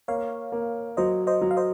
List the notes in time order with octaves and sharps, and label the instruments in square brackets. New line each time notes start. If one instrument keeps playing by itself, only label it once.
[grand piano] A#3 [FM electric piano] C#5 F5
[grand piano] A#3
[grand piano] F#3 [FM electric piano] C5 D#5
[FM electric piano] C5 D#5
[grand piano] F#3
[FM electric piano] F5
C5 D#5